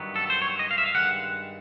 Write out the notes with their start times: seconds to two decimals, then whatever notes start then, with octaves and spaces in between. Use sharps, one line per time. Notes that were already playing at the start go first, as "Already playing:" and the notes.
Already playing: G2 D#3 F#3 B3
0.16 A4
0.30 C5
0.42 C#5
0.59 D#5
0.71 F5
0.78 E5
0.86 F5
0.95 G2 D#3 G#3 F#5